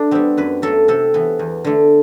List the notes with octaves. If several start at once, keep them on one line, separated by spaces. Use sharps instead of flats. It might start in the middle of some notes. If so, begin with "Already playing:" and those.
Already playing: A3 D4
G3 B3 C4
F#2 B4
F#3 A3 A4
C3 A4
E3 B3
E2
D3 A3